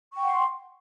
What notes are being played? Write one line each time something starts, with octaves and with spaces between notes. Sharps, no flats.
F#5 G5 C6 C#6